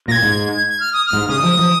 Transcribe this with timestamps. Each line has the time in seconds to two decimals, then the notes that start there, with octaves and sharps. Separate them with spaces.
0.08 A#2 A#6
0.11 G#6
0.23 G#2
0.69 G#6
0.80 F6
0.93 D#6
1.06 F6
1.13 G#2
1.29 C#3 D#6
1.43 F3
1.59 F3